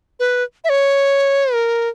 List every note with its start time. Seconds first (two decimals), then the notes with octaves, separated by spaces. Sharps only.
0.20 B4
0.64 E5
0.69 C#5
1.54 A#4